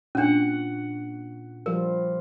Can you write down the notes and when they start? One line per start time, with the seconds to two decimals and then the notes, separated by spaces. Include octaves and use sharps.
0.15 A#2 C#4 D4 F#5
1.66 F3 G3 F4 A#4